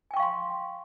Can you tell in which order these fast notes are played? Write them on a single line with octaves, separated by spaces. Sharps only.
G#5 G5 C#6 F5 C6